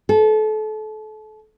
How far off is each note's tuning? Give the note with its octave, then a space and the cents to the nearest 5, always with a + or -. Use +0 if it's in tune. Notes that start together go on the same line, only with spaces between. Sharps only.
A4 -30